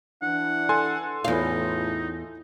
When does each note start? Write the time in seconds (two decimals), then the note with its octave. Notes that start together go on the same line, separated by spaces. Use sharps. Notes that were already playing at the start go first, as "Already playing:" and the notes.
0.22 E3 D4 E4 F#5
0.69 A4 G#5 C6
1.24 E2 A2 D#4 F4 F5